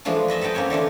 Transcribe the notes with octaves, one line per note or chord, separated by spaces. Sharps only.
E3 F3 G#3 A3 D4 F4
B4 D#5 E5 A5
A4 B4 D#5 G5 A5
A#3 C4 C#4 C#5
D3 E3 A3 D4